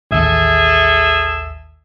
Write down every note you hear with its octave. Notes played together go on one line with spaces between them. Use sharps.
A1 D#2 G#4 A4 E5